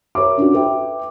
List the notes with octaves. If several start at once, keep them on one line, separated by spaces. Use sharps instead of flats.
A#4 C#5 E5 D6
C#4 D4 F4 F#4
A4 B4 E5 G5